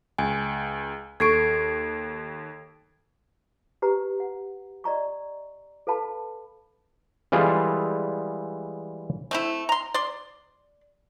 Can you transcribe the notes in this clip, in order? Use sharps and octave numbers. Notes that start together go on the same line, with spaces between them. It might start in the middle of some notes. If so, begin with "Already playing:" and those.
C#2 G#5
D#2 A4 C#6 G#6 C7 D7
G4 B4 A#5
F#5
D5 D#5 A#5 C#6
A4 B4 F5 A5 B5
E3 G3 G#3 F4 G#4 A4
A3 C4 E4
A#5 C6
D5 C6